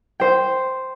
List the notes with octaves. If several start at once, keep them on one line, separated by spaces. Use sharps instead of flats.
C5 G5